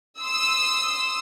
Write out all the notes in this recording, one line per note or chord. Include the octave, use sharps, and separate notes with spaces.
C6 D#6 E6